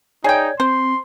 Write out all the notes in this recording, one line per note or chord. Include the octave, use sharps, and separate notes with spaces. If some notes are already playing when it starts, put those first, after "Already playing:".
D#4 G#4 C#5 D5 G5 G#6
C4 C5 C6